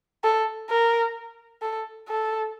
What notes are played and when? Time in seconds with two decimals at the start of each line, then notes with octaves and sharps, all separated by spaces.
0.24 A4
0.70 A#4
1.62 A4
2.08 A4